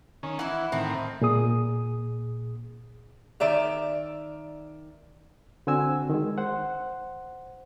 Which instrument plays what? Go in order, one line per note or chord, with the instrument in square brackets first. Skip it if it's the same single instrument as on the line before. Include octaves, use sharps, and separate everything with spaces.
[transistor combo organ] D#3 C#4
[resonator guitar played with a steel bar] E3 E4 [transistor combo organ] F#5
[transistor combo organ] A2 D#3 [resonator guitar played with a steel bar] C4
[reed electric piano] A#2 G#4 D#6
[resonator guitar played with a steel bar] D#3 D5 E5 A#5
[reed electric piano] D3 C4 F#4 G#5 E6
D#3 G#3
C5 F#5